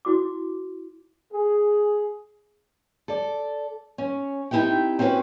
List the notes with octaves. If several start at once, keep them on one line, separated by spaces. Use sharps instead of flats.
E4 F#4 D6
G#4
A4 D5
C#4
C4 D#4 E4 G4 E5 G5
C4 C#4 E4 F#4 B4